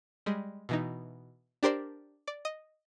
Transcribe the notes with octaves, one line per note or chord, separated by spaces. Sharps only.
G3 G#3
B2 E3 D#4
D4 G4 A#4 C5 D5
D5
D#5